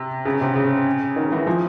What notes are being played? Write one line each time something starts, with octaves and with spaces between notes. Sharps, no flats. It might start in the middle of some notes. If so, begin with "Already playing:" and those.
Already playing: C3
C#3
C3
C#3
D#3
E3
F3